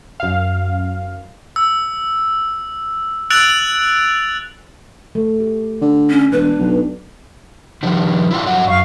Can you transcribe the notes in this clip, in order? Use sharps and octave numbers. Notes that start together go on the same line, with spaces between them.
F#2 F5
E6
E6 F#6 A6 D7 F7 F#7
A3
G4
D3
C#4
E1 D4 B4
B1
D#3 F3 G3
E4 F4 G5
G2 F#3 F#5
F#2 F5 C#6